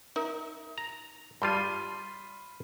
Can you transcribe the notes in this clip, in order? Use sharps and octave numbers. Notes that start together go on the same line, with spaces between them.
D#4 A#4 E5
A#5
G2 G3 F4 B5 C6 F6 C7 D#7